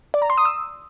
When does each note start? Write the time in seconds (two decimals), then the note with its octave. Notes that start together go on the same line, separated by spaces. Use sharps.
0.14 D5
0.22 A#5
0.30 C6
0.38 D#6
0.45 E6